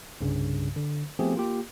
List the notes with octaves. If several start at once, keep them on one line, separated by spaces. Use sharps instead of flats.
C2 G2 C#3
D3
F3 A3 B3 C4 G4 G#4
A#3 F4 G4